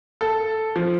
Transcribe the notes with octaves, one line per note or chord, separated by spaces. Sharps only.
A4
F3